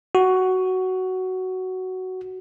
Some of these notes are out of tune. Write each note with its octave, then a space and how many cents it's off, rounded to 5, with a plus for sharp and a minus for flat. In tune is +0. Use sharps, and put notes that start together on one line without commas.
F#4 +10